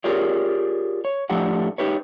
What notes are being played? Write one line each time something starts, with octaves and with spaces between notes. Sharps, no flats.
F4 G4 G#4 A#4 C#5 D5
C#5
A2 F3 A3 D4 G4 F#5
D#4 G4 B4 C#5